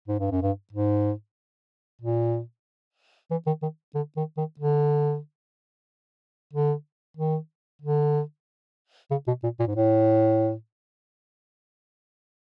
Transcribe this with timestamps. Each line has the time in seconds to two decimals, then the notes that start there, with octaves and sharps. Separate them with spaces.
0.08 G#2
0.19 G2
0.31 F#2
0.42 G2
0.73 G#2
2.02 A#2
3.31 E3
3.47 D#3
3.62 D#3
3.95 D3
4.17 D#3
4.37 D#3
4.59 D3
6.53 D3
7.17 D#3
7.82 D3
9.11 C#3
9.27 B2
9.44 A#2
9.60 A#2
9.67 G#2
9.76 A2